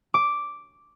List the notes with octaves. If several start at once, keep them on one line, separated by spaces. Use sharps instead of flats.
D6